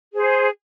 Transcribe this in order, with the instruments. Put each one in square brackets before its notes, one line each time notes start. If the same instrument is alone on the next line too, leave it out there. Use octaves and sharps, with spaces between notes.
[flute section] G#4 C5